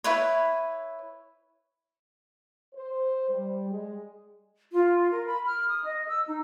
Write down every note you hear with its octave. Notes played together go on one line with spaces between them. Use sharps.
E4 B4 C#5
C5
G3
G#3
F4
A#4
B5
F6
D#6
D#5
E6
D#4